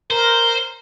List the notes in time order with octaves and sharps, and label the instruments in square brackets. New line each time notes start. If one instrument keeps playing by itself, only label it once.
[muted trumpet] A#4 [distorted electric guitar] C5